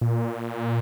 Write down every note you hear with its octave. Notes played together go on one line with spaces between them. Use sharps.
A#2